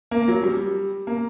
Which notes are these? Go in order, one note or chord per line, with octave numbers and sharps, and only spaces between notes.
A#3
F#3
G3
A#3